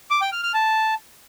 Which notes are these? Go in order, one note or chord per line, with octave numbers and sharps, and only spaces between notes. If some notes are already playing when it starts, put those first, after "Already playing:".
D6
G5
F6
F6
A5